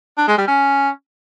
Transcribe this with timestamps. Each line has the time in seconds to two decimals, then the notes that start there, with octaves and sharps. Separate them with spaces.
0.17 D4
0.28 G#3
0.38 G3
0.48 C#4